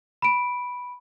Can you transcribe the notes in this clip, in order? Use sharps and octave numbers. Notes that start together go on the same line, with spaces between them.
B5 D7